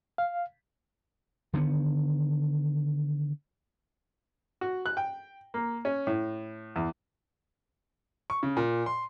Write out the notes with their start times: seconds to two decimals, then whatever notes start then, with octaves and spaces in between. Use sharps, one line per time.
0.18 F5
1.54 D3 D#3 A#3 B3
4.61 F#4
4.86 F#6
4.97 G5
5.54 A#3
5.85 C#4
6.07 A2
6.76 E2
8.30 C#6
8.43 C#3
8.57 A#2
8.86 C6